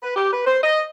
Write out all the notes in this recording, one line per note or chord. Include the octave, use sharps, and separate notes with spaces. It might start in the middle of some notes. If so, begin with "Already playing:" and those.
B4
G4
B4
C5
D#5